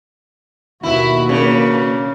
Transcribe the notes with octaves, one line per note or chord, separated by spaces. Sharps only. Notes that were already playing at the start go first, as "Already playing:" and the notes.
D#2 B2 E4 F#4 B4 E5 B5
C#3 A#3 D4